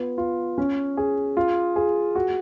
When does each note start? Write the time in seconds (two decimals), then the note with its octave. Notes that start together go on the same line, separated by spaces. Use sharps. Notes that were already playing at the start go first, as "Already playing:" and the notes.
Already playing: B3 F4
0.18 F4
0.58 C#4
0.97 G#4
1.37 F4
1.76 G#4
2.16 F#4